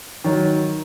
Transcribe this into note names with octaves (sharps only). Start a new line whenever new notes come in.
D#3 F#3